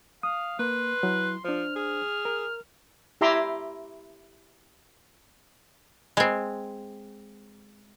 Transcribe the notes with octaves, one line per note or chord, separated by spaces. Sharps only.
F5 D#6
A#3 B4 C6
F#3 E4
F3 D4 C5 F6
G#4 F6
A#4
E4 G4 E5 A#5 C6 D6
G#3 C4